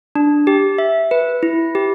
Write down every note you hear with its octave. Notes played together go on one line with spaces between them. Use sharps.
D4
G4
E5
B4
E4
G4